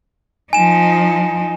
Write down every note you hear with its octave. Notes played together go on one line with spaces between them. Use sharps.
F3 D#4 G#5 E7